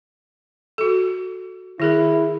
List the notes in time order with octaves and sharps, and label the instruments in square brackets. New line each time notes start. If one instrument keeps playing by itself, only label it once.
[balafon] F#4 A4
[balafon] D#3 G#4 A#4 [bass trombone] E4